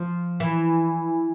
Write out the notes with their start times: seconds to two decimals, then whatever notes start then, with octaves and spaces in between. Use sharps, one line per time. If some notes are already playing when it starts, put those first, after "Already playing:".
Already playing: F3
0.40 E3